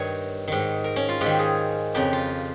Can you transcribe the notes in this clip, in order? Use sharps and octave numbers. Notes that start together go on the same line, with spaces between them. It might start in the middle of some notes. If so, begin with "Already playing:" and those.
Already playing: G2 D#3 C#5 D#5
G#2 D#3
A#4
C#4
F4
G#2 D#3 G4
G#4
F2 C#3 G4
F4